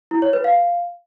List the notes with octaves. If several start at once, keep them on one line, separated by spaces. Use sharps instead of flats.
E4
C#5
B4
F5